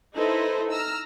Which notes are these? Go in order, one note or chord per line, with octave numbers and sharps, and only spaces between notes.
D#4 E4 A4 B4 C5 D#5
A#5 E6 F6